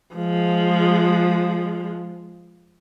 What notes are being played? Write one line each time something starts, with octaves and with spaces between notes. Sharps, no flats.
F3 G#3